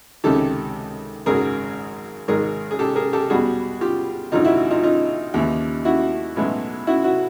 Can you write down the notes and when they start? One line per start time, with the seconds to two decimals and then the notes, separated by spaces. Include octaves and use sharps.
0.24 C#2 C3 D#3 G4 A4
1.26 G#1 F#2 C#3 F#3 G#4 A#4
2.28 G#1 G#2 D#3 G#4 A#4
2.71 G#4
2.79 G4 A4
2.96 G#4 A#4
3.13 G4 A4
3.30 E2 B2 G3 F#4 G#4
3.81 F4 G4
4.32 G#1 F#2 D3 D#4 F4
4.45 E4 F#4
4.70 D#4 F4
4.83 D#4 F4
5.34 D#2 C#3 E3
5.85 E4 F#4
6.36 B1 A2 E3 G#3
6.87 E4 F#4
7.04 E4 F#4